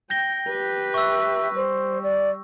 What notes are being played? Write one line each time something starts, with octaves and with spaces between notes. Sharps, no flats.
G5 G6 A#6 G7
G4 B4
E5 C#6 E6
G3 C5
D5